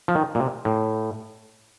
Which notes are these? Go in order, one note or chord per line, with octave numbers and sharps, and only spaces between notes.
F3
D#3
A#2
C3
A2